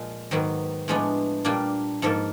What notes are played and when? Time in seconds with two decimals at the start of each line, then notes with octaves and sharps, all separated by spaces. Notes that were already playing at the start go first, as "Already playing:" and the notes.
Already playing: A#2 F3 G#3
0.31 G#2 D#3 F#3 B3
0.88 A2 F3 G#3 B3 D4
1.45 A#2 G3 A#3 D4
2.02 G#2 F3 A#3 A4